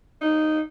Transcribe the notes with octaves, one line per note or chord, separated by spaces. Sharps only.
D#4